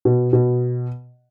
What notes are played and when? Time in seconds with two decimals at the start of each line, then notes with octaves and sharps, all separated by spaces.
0.05 B2
0.33 B2